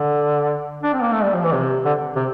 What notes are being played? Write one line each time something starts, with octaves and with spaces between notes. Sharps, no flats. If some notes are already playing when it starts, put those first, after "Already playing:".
Already playing: D3
D4
C4
A#3
A3
G3
F3
E3
C3
D3
C3